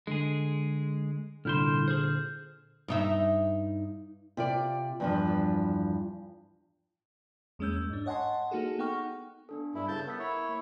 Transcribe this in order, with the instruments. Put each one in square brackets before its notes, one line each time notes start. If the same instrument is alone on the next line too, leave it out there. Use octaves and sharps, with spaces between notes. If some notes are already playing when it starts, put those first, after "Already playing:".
[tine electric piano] D3 [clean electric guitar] G#3 G#4
[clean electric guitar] C2 E4 C6 [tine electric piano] A#2 D3 [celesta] F6 G6 E7
[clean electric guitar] G#4 C5 [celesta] F6 G6
[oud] G2 D#4 E5
[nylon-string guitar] C3 F4 D5
E2 G2 F3
[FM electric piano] E2 G#3 A#3 C#4 E6 G6
G#2 D4
C#5 D#5 F#5 G#5 A5 C6
A#3 D#4 F#4 G#4 A4
B3 D#4 F#5 G5 C#6 F6
[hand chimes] B3 D4 A4
[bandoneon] G2 E4
C#3 A5 G6
[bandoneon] B3 [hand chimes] A#4 E6 B6
[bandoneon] E4 C#5
[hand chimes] A#3 C#6